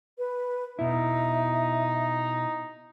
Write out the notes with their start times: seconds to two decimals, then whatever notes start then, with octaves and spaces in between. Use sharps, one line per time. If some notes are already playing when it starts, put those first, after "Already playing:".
0.18 B4
0.79 B2 D#4 E4 E5